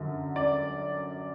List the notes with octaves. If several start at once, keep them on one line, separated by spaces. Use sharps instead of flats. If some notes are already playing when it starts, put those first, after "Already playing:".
Already playing: F#2 D3 F#3
D5